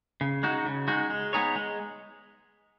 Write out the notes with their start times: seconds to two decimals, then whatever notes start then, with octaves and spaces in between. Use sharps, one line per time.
0.21 C#3
0.43 G#3 D#4 F#4
0.66 C#3
0.88 G#3 D#4 F#4
1.10 G#3
1.33 B3 D#4 G#4 C#5
1.56 G#3